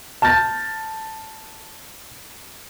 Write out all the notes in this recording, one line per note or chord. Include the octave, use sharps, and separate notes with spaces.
A5 F6 G6 A6 A#6